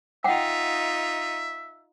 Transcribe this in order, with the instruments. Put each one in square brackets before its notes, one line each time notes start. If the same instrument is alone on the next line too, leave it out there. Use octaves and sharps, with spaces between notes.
[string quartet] D#4 F4 [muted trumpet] E5 [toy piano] F#5 G5